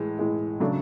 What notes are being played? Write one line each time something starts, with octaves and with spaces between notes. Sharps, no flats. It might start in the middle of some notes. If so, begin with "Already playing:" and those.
Already playing: A2 E3 G#3
A2 E3 G#3
C#3 F#3 A3 D4